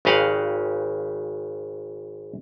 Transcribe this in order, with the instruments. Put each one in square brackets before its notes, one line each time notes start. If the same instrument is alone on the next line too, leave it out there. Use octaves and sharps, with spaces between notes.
[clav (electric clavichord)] G#1 C#3 G4 D#5 F5 F#5